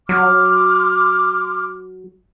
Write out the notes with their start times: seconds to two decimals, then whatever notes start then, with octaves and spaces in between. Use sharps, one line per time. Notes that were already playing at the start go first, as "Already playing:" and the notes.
0.09 F#3 C6 D6 F6